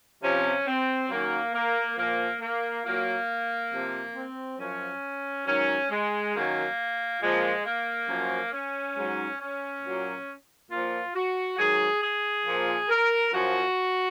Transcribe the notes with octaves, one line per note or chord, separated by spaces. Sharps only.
C3 F3 C#4
C4
F#2 D#3 F#3 A#3
A#3
A#2 F3 A#3
A#3
A#2 F#3 A#3
C3 F3
C4
F#2 F3 C#4
G#2 D#3 F#3 C#4
G#3
F#2 D#3 F#3 A#3
A#2 F3 G#3
A#3
F#2 F3
C#4
G#2 F#3
C#4
A#2 F#3
A#2 F3 F4
F#4
G#2 D#3 F#3 G#4
G#4
A#2 F3
A#4
F#2 F3 F#4